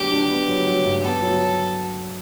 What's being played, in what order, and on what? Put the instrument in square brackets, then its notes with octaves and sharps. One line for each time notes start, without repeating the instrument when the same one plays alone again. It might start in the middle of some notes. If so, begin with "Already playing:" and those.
Already playing: [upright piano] F#3 B3 D4 [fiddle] G4
[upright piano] D4
B3
F#3
F#3
G2
[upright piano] B3 [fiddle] A4
[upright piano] F#3